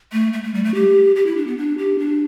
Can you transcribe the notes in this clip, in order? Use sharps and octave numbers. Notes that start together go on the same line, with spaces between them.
A3
A3
A3
G3
A3
G4
G4
E4
D4
B3
D4
G4
D4